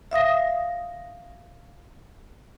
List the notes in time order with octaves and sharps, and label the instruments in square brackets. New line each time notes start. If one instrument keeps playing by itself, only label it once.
[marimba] E5 F5 D#6 A#6